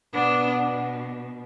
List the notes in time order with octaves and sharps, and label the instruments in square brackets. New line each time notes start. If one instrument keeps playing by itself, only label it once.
[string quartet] B2 B3 D4